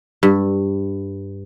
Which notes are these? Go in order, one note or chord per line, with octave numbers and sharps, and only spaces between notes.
G2